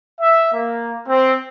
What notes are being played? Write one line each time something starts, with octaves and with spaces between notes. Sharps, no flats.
E5
A#3
C4